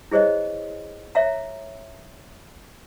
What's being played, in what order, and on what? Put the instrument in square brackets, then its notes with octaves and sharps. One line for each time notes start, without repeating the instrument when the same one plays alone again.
[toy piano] E4 G#4 C5 C#5 D#5
C#5 E5 F5 A#5